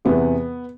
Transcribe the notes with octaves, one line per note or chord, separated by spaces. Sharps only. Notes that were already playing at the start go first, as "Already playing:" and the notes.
E2 C3 E3 B3